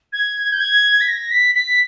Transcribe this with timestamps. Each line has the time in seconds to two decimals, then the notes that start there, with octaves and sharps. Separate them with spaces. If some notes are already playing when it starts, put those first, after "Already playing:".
0.12 G#6
0.52 G6
0.60 G#6
1.01 B6
1.08 A#6
1.31 B6
1.55 B6